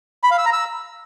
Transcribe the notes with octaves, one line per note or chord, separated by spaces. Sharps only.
B5
F5
E6
A#5
E6